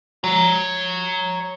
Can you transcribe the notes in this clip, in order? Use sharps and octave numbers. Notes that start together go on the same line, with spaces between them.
C#5 A#5